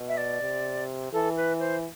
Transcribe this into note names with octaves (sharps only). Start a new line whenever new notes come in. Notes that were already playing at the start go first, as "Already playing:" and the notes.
Already playing: B2
E5
D5
C3
E3 A4
B4
C5